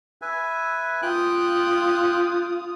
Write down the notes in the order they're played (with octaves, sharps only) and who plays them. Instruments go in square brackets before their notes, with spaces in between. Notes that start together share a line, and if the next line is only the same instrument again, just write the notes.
[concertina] B4 E5 G#5
[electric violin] F4 D#6 [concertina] G5 F#6